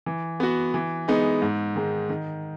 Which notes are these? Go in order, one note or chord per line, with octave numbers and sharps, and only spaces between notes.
E3
B3 F#4
E3
G#3 B3 D#4
G#2
D#3 G#3
D#3